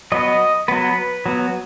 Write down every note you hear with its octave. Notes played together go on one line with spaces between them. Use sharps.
F#3 B3 D#5
F#3 B3 B4
F#3 B3